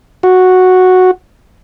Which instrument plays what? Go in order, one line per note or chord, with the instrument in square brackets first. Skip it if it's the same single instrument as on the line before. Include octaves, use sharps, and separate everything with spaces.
[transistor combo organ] F#4